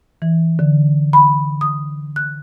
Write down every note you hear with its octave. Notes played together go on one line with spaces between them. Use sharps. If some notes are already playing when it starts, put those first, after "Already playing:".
E3
D3
B5
D#6
F#6